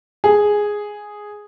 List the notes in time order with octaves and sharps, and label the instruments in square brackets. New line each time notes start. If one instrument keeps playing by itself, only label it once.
[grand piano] G#4